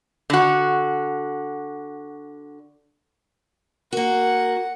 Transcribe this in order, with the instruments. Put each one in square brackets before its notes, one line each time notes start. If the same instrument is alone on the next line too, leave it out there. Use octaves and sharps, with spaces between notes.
[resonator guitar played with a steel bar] D3 F#4
[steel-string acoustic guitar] A#3 F#4 [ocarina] A#4 [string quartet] F#5